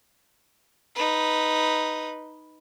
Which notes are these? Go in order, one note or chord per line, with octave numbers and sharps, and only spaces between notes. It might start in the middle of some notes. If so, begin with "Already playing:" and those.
D#4 B4